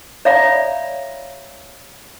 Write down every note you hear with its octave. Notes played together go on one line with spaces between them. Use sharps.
C#5 D5 E5 F5 A#5 B5